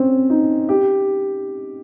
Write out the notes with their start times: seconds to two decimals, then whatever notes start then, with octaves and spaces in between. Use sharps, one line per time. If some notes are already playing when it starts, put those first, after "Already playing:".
Already playing: C4 C#4
0.30 D#4
0.69 G4